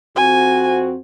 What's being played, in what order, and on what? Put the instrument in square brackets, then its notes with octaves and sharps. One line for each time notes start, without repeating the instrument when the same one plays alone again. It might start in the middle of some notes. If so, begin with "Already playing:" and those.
[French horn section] F2 C4 F#4 [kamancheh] G#5